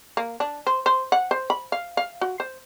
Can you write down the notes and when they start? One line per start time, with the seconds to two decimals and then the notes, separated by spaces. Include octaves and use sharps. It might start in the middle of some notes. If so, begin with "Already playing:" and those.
0.17 A#3
0.40 D4
0.67 C5
0.86 C5
1.12 F#5
1.31 C5
1.50 B5
1.72 F5
1.97 F5
2.21 F#4
2.40 C5